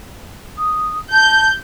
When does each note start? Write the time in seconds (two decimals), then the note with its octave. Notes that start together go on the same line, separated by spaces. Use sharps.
0.58 D#6
1.12 A5 G6